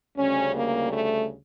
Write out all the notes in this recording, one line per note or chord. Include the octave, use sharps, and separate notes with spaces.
D2 C#3 G3 C#4
A#3
A3